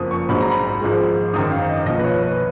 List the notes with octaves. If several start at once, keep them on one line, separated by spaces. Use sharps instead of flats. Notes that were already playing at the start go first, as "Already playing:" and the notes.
Already playing: F#1 F2 F3 D#6
C#6
A#1 G#2 F#3 B5
A#5
B5
G#1 G#2 F3 G#3
G#1 F#2 D#3 D#6
F5
D#5
B1 A#2 F3 D#5
B4
C#5
B4